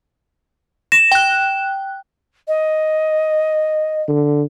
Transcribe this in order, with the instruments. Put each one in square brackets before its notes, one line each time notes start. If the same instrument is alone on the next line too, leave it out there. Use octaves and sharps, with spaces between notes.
[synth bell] A#6 [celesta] E7
[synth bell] G5 F#6
[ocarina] D#5
[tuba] D3